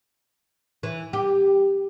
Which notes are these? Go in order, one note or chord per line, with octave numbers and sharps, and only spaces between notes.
E3
G4